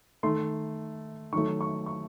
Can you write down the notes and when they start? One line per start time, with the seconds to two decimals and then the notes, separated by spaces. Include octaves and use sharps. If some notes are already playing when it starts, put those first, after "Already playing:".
0.23 D#3 A3 C6
1.33 D#3 F#3 A3 C#6
1.61 C#6
1.86 C#6